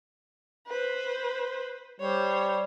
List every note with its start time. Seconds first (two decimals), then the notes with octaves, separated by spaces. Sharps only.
0.67 B4 C5
2.00 G3 C5 C#5